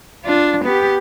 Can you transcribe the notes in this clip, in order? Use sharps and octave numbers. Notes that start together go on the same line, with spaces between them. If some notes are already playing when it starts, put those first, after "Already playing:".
D4 F4
B3 G4